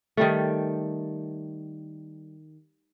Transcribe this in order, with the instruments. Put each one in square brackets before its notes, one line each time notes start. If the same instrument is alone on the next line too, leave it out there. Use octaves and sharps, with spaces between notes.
[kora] D#3 G3 A3